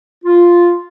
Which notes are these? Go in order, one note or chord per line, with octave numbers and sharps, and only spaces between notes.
F4